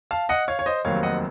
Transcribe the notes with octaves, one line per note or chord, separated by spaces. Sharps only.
F5 A5
D#5 F#5
C#5 F5
C#5
C5 D#5
F1 D#2 D#3 F#3 C4 C#5 F5
D#5 F#5